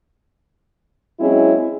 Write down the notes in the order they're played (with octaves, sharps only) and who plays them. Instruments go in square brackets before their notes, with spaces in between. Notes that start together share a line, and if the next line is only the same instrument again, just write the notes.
[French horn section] F#3 G#3 C4 C#4 E4 G#4